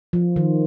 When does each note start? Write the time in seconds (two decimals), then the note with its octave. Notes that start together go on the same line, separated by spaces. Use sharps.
0.13 F3
0.36 D#3